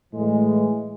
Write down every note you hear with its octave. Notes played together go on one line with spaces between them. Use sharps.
A2 E3 G#3